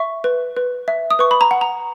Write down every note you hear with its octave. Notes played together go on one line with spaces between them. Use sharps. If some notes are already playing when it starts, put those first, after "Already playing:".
Already playing: E5 C#6
B4
B4
E5
D#6
B4 C#6
B5
A#5
F#5
A#5